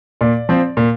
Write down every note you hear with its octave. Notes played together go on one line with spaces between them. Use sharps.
A#2 D5
F3 C4
A#2